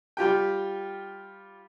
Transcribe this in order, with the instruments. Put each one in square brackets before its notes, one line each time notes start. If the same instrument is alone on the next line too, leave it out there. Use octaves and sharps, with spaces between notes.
[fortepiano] G3 F4 G4 G5